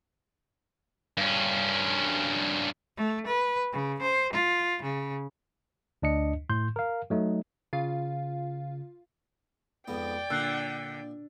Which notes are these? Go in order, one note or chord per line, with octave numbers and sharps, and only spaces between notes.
G2 C#4
A3
B4
C#3
C5
F4
C#3
D2 D4 D#5 C#7
A2 C6 G6
A#4 F5
F#3 A3 D#4
C#3 F4 F5
F2 G#2 B3 D5 G5
A#2 D3 E6 F#6 C7